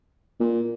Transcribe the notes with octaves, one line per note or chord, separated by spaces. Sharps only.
A#2